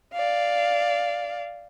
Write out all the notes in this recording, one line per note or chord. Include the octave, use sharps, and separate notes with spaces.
D5 F5